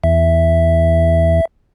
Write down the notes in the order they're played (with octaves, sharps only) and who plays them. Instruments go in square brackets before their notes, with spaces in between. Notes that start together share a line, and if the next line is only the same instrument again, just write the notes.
[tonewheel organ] E2 [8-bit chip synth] E5